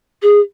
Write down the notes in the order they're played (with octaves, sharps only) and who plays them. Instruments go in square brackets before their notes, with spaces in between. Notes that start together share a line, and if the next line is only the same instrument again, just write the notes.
[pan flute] G#4